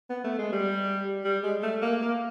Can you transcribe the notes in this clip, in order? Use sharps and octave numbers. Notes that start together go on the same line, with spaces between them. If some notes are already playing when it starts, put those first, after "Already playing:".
B3
A3
G#3
G3
G3
G#3
A3
A#3
A#3